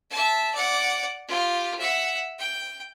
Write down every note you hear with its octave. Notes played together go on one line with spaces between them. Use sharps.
E5 A5
D5 F#5
F4 G4
E5 F#5
G5